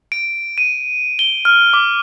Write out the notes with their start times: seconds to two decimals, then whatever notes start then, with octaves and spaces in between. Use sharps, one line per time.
0.12 D7
0.58 D#7
1.19 G7
1.45 F6
1.73 D6